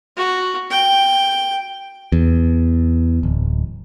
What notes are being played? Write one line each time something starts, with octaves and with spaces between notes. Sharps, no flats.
F#4
G5
E2
D1